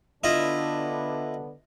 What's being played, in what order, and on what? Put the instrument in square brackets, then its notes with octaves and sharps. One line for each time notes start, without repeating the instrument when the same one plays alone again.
[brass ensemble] D3 B3 D4 [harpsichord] E4 F4 D#5